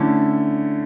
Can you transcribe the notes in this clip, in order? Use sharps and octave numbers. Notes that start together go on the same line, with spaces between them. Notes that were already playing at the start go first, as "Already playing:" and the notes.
Already playing: D3 A3 C#4 E4